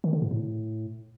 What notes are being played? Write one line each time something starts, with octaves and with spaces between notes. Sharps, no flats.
D#3
D3
G#2
A2